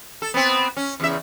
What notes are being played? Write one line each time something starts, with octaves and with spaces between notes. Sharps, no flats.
A4
B3 C4
C#4
E2 C#3 E5